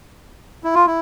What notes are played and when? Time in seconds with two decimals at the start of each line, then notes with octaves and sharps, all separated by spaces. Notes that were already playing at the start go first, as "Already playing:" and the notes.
0.64 E4
0.75 F4
0.87 E4